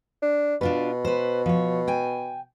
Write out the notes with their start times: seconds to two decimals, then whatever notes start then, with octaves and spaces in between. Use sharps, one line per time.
0.22 D4
0.61 B2 D4 F4 B4
1.05 B4 C5
1.46 F3 C#5
1.88 G5 G#5